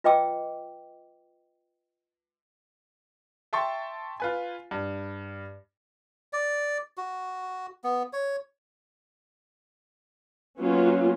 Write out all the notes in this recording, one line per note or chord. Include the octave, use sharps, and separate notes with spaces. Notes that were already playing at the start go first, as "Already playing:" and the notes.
F4 B4 D#5 G5 D6 E6
E5 G5 A5 C6 C#6 A6
F4 B4 G#5
G2
D5
F#4
B3
C#5
F#3 A#3 B3 C#4 F4 F#4